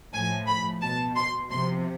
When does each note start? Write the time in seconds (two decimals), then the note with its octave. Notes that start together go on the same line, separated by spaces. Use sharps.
0.13 A2 F3 G#5
0.47 B5
0.81 B2 A5
1.16 C6
1.50 C3 F3 C6